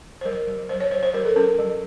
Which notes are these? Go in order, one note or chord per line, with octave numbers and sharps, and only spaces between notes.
C5
F#3 A#4
F#3
F#3 C5
C#5
F#3 C5
C5
F#3 A#4
A4
C#4 A#4
F#3